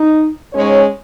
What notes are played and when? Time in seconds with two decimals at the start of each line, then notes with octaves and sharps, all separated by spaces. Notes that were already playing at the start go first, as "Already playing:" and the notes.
Already playing: D#4
0.54 G#2 G#3 C#4 C#5